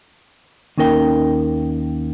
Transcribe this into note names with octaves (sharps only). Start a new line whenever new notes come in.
D#2 C#4 D#4 A#4 G5